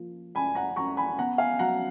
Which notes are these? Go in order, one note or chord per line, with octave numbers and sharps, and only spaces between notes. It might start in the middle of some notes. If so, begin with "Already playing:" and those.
Already playing: F3 A#3
F#2 G#5 B5
F#5 A#5
F#2 A#5 C#6
G#5 B5
B3 F#5 A#5
F5 G#5
F#3 F#5 A#5